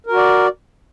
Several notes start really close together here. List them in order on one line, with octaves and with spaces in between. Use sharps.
A#4 F#4 D5